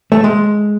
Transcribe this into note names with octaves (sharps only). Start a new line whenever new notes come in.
A3
G#3